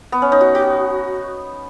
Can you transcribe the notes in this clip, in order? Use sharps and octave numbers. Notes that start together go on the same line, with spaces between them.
B3
C#4
D#4
F#4
F#4